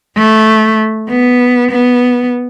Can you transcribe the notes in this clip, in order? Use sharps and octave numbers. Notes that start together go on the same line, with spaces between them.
A3
B3
B3